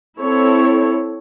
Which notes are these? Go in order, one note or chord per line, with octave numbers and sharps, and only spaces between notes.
C4 E4 A4 C#5